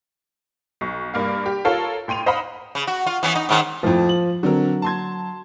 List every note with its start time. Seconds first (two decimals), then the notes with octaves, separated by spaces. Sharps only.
0.81 B1 C#6
1.14 G2 A#3 F5
1.46 G4
1.65 F4 A4 A#4 C#5 F5
2.08 A2 G5 C6 D#7 F7
2.26 C5 D#5 F5 F#5 A#5 B5
2.75 C#3
2.87 F#4
3.06 F4
3.23 E3 B3 C#4
3.35 D#4
3.49 G#2 D#3 C#4
3.83 F2 A2 F3
4.09 F#7
4.43 D3 F#3 C4 A#4
4.82 A5 C6 G#6